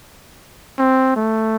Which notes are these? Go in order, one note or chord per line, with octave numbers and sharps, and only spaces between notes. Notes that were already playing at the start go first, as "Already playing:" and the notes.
C4
A3